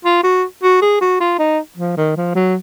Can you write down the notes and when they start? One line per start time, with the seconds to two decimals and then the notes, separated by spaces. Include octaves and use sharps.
0.04 F4
0.23 F#4
0.63 F#4
0.82 G#4
1.01 F#4
1.20 F4
1.39 D#4
1.78 F3
1.97 D#3
2.16 F3
2.35 F#3